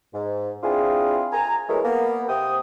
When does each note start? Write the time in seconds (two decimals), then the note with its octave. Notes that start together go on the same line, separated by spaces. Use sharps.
0.14 G#2
0.63 C4 D4 E4 F4 G#4
1.33 G#5 A#5
1.69 E3 F#3 G#3 A3 G#4 A#4
1.84 A#3 B3
2.29 C3 G5 D#6